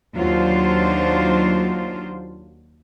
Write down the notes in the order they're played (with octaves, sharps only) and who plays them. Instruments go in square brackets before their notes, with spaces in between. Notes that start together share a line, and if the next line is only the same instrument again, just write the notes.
[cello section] D#2 F#3 D4 F4 C5